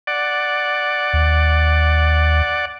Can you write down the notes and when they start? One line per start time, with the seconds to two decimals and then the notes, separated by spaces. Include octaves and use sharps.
0.07 D5 F#5
1.13 D#2